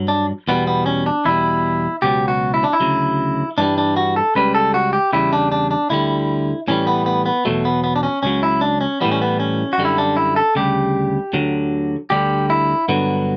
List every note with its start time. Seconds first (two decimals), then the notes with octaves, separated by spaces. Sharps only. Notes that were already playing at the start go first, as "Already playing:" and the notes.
Already playing: G2 F#3
0.08 D4
0.48 E2 B2 G3 B3
0.67 B3
0.86 C#4
1.06 D4
1.25 E2 B2 G3 E4
2.02 C#2 B2 F#3 G4
2.28 F#4
2.54 E4
2.64 D4
2.73 E4
2.80 D2 C#3 F#3
3.58 G2 E3 G3 D4
3.78 D4
3.97 F#4
4.16 A4
4.35 C#2 C#3 G3 B4
4.55 A4
4.74 F#4
4.93 G4
5.13 E2 C#3 G3 E4
5.33 D4
5.52 D4
5.71 D4
5.90 D2 D3 G3 E4
6.68 A2 E3 G3 C#4
6.87 B3
7.06 B3
7.26 B3
7.45 E2 B2 F#3 A3
7.65 B3
7.84 B3
7.96 D4
8.03 C#4
8.23 C#2 C#3 F#3 C#4
8.43 E4
8.61 D4
8.81 C#4
9.01 A2 E3 G3 B3
9.11 C#4
9.21 B3
9.40 C#4
9.73 F#4
9.78 F#2 D3 G3
9.85 E4
9.98 D4
10.17 E4
10.36 A4
10.55 D2 C#3 G3 G4
11.33 D2 D3 F#3
12.10 D2 D3 G3 G4
12.50 E4
12.88 G2 D3 F#3 B3